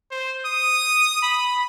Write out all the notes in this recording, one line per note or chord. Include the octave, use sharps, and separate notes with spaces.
C5
D#6
B5